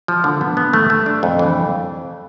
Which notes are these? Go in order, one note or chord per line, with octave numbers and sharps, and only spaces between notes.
F3
D3
B3
B3
A3
A3
D4
F2
E3